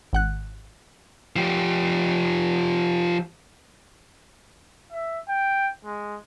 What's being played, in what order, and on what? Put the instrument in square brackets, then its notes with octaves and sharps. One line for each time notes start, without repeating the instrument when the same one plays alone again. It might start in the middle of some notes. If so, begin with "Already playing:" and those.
[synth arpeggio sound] G#1 F#5 F#6
[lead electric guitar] F3 G4
[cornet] E5
G5
G#3